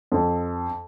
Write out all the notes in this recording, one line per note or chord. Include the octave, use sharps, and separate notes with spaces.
F2